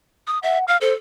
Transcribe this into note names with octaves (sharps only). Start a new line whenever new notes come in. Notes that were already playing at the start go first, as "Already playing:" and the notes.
D#6
E5 F#5
F5 F6
A4 C5